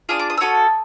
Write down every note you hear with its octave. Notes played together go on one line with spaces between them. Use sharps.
D4 F4 G#4 D#6
D6
D#6
E6
C#4 F#4 A4 D#6